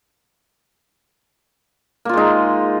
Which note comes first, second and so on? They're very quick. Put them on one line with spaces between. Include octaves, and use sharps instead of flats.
A#3 F4 G#3 D#4